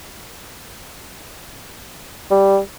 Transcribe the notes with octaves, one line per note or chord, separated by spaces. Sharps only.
G3